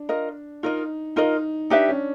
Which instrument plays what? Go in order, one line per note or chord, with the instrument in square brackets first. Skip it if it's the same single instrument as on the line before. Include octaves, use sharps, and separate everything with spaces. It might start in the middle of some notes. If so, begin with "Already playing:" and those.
Already playing: [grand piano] D4
[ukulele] F4 A#4 D#5
[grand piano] D#4 [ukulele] F4 A#4 D#5
[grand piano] D#4 [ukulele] F4 A#4 D#5
[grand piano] D4 [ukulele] D#4 G4 B4 E5
[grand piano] C#4